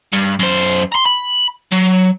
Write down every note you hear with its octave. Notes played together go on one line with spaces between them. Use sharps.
G2
F#2 C5
A#5 C6
B5
F#3